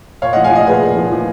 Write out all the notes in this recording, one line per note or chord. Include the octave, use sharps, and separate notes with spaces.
A#2 C#5 F5
D#5 F#5
F3
F5 G#5
F3 D#5 F#5
A#2 G#4 B4
A#2
F3
F3